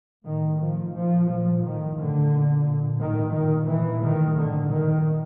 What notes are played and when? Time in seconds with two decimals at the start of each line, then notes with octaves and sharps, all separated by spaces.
0.25 A2 D#3
0.60 A2 F3
0.95 A#2 F3
1.28 A#2 F3
1.63 A2 D#3
1.97 A2 D3
2.32 A#2
2.65 A#2
3.00 A2 D#3
3.34 A#2 D#3
3.68 A#2 E3
4.03 A2 D#3
4.37 A2 D3
4.71 A#2 D#3